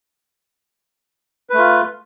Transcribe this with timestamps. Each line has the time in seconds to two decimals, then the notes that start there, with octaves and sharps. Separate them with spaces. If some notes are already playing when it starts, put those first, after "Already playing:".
1.50 B4
1.54 A3
1.58 F4